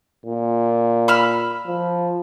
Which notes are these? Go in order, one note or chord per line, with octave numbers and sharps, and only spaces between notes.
A#2
B5 E6 F6
F3